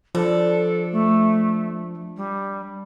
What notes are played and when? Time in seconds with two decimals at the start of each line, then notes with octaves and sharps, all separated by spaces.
0.15 F3 D4 A4
0.91 A3
2.16 G3